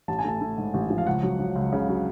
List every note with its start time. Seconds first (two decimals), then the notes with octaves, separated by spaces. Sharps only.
0.08 A1 A5
0.19 G#5
0.24 A3 A5
0.41 A3
0.58 G#2
0.74 A1
0.90 F3
0.98 F5
1.07 C#2 F#5
1.23 F#3
1.39 F#3
1.56 C#2
1.73 C#3
1.89 F#3